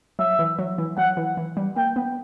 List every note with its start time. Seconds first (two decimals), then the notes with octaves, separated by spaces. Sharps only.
0.19 F#3 E5
0.39 E3
0.59 F#3
0.78 E3
0.98 F#3 F#5
1.17 E3
1.37 E3
1.57 G3
1.76 A#3 G5
1.96 B3